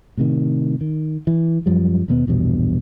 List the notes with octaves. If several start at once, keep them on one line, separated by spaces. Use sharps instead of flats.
A2 C3 D#3
D#3
E3
F#2 F3 G3
D#2 B2 G#3 B3
A#1 E2 G2 B2